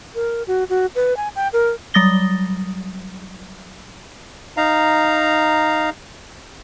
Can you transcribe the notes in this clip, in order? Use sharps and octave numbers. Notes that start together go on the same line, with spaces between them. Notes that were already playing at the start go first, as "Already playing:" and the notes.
A#4
F#4
F#4
B4
G#5
G5
A#4
F#3 G3 D#6 A6 A#6 G7
D#4 F5 A#5